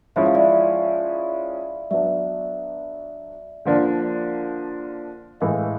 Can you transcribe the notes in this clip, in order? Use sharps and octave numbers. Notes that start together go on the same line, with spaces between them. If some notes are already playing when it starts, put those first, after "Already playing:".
F3 G#3 C#4 E4 E5
F5
D5 E5
F#3 B3 D4 D5 E5
D3 F3 A#3 D4
A2 E3 G#3 D#5 F5